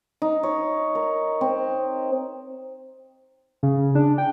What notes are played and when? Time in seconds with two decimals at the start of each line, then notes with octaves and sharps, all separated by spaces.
0.22 D#4
0.43 C#5
0.95 A#4
1.41 C4
3.63 C#3
3.95 D4
4.18 G5